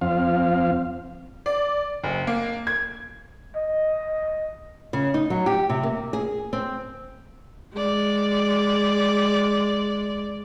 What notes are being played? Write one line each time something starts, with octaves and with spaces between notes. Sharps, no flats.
F2 C4 F5
D5
F#1
A#3
G#6
D#5
C#3
D#4
F#3
G4
C3
A#3
G#4
C4
G#3 D5